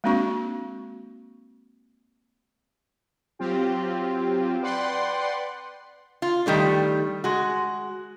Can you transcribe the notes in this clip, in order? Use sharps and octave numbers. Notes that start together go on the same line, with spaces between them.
G#3 A#3 C4 D4 F#4 C#6
F#3 C4 F4 G4
B4 D5 F#5 G5 C6
F4
D#3 G3 A3 D4
G#3 F#4